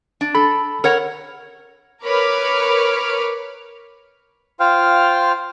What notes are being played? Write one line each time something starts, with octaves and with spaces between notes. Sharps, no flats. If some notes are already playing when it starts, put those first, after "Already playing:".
D4
A4 B5
A#4 C#5 F#5
A#4 B4 C#5 B5 D6 F6
F4 C5 F5 G5 F6